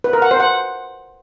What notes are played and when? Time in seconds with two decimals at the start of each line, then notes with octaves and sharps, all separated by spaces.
0.04 B4
0.13 A#4
0.22 F#5
0.31 C5
0.40 F#5